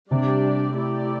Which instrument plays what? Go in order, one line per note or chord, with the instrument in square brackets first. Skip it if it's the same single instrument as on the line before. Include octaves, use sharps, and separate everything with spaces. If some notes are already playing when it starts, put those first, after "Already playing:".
[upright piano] C3 [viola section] G3 D4 G4 D5
[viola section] A3 E4 G4 D5